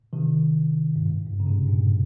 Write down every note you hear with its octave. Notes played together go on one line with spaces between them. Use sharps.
C3 D#3
G2
G#2
G2
C#3
G#2 C3
G2 A#2